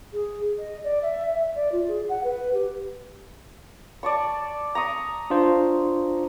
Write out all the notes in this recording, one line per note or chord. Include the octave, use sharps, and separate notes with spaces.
G#4
D#5
D5
E5
E5
D5
F4
G#4
F#5
B4
G4
D5 A5 C#6
A#5 C#6 D#6
D4 F4 C5